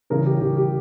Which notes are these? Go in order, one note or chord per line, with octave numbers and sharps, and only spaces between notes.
C#3 E3 G3 G#4 A#4
G4
C#3 E3 G3 G4
G4